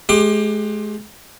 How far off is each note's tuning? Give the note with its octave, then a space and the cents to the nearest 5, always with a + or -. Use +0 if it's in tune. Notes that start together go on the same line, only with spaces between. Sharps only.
G#3 +35 G4 +15 D6 +30